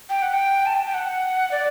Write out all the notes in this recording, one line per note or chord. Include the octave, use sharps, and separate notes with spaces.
G5
F#5
G5
A5
G5
G5
F#5
D5